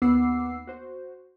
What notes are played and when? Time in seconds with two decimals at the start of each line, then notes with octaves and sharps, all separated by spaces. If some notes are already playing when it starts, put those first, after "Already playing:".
0.02 D#2 B3 F#5 D6 E6 C7
0.67 F#4 C5